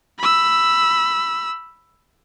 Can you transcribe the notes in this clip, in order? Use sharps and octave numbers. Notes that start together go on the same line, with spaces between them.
B5 E6